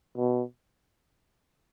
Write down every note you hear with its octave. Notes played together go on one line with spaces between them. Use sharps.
B2